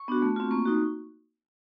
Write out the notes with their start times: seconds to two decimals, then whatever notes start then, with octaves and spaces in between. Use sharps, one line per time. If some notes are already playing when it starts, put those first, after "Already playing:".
Already playing: C#6
0.08 B3 D4 F#4
0.22 A3
0.36 C4 F4
0.51 A#3 C#6
0.65 D#4 F#4